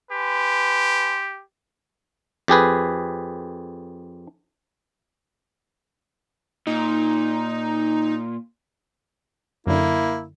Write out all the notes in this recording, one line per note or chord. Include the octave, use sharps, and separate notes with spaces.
G4 B4 G#5 C6
F2 G4 G#4 B4
A#2 D#4
F#2 D3 A#3 E4